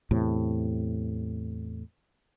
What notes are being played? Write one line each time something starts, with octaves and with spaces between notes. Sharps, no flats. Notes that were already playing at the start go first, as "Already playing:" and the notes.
E2 A2 C3